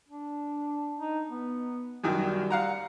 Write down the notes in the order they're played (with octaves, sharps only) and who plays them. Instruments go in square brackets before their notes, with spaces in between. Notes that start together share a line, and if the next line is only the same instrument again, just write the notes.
[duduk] D4
D#4
B3
[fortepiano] F#2 D#3 F#3 [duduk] G3
[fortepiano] F5 F#5 A#5